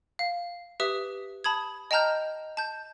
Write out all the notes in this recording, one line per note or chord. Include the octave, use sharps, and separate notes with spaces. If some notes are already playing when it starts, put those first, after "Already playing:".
F5
G4 B4 E5 D#6
A5 B5 D#6 G#6
D#5 G5 A5 A#5 F6 G6
A5 G6